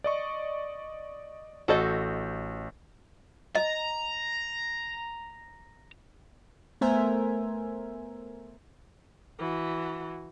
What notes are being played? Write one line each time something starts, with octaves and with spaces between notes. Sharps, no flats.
D5 D#5 C#6
A1 F#4 A4 D#5 G6
D#5 A#5
A3 B3 A#4 C5 E5 G#5
E3 F#4